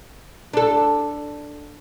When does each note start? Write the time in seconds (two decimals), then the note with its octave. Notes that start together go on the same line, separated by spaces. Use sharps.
0.53 D4 A4